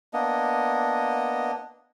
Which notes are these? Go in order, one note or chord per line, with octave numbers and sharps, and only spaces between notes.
A#3 B3 D4 D#5